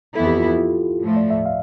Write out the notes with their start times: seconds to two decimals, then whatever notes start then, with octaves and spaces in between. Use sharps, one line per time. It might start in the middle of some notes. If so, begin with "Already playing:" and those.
0.15 F2 E3 B3 E4 A4
0.26 G4
0.38 F4
0.49 E4
0.59 F4
1.02 A2 F3 A3
1.16 D5
1.30 E5
1.46 F5